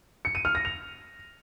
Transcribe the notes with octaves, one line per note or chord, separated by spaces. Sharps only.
C#7
D#7
F6
A#6
F7